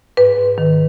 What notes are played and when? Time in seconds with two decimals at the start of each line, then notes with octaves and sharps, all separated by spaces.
0.17 G#2 B4
0.38 G#2
0.58 D#3